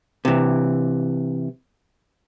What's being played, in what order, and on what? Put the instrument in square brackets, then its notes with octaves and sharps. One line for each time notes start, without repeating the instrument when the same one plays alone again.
[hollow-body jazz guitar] C3 E3